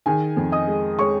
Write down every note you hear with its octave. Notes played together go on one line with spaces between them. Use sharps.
D#3 G#4 G#5
F2
D#5 D#6
G#3
G#3 C#5 C#6